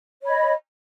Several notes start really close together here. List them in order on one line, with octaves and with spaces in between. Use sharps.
C#5 B5 D#5